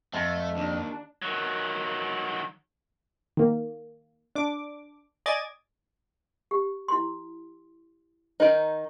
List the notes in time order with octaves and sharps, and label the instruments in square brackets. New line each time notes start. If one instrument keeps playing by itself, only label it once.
[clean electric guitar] F2 [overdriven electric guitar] A3
[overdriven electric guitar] D#2 [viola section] D4
[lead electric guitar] D#3 F#3
[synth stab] D#3 A#3
D4 D6
D5 D#5 G#5 D6 G#6 A6
[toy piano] G4
E4 C6
[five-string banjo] D#3 D#4 [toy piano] C5